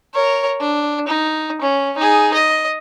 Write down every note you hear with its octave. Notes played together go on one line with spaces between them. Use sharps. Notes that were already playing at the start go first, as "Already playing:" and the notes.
A#4 C#5
D4
D#4
C#4
D#4 G#4
D#5